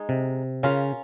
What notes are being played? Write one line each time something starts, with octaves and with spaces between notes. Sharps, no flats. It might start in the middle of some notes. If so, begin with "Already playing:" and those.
Already playing: G#3 D#4
C3
C#3 C#4 F4 A#4